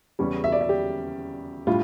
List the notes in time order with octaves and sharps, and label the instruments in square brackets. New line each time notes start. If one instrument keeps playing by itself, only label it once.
[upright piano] E2 C#3 G3 C#4
[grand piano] E5
D5
E5
G4
[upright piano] A2 G3 D4 [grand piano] F4